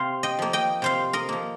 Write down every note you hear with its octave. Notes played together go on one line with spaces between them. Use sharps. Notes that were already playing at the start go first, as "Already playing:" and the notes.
Already playing: C3 C5 F5
D#5 G5
F3 A#3
D#5 G5
C3 C5 F5
A#4 D#5
F3 A#3